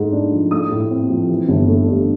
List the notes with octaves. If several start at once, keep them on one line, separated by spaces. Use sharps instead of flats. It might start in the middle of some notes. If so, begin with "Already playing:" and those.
Already playing: G#2 A3
D4
F3
A3 D#6
A2
C4
F3
E3
G1
A3
G2